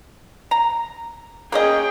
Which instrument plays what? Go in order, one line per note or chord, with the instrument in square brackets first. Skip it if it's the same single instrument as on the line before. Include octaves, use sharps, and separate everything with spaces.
[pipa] A#5
[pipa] A#3 C#4 D#5 [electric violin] G#4 G5